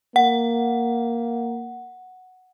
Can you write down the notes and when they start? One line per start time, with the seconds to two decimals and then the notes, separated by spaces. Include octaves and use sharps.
0.16 A#3 F#5